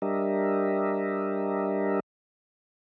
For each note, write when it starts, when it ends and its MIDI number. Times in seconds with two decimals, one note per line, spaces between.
0.02 2.00 55
0.02 2.00 62
0.02 2.00 67
0.02 2.00 70
0.02 2.00 75
0.02 2.00 76